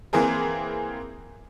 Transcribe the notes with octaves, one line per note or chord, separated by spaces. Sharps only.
E3 A#3 C4 G#4 A#4